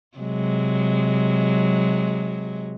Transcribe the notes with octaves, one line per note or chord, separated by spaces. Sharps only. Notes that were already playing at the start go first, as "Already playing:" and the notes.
C3 F#3 G#3